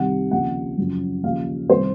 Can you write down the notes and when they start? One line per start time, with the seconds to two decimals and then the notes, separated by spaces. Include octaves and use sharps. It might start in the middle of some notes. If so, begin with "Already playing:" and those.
Already playing: C2 C3 D#3 F#5
0.31 D#2 C#3 F3 F#5
0.78 F#2 C#3 F3
1.23 D#2 C#3 F3 F5
1.69 C2 C3 D#3 C5